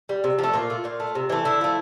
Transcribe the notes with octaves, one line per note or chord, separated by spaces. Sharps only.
G3
C3
F3 A3
A#2 F4
A3
A#2 F4
A3
C3
E3 A3
D3 E4
F3 A3